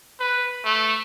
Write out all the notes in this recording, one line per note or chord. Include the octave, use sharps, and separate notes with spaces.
B4
A3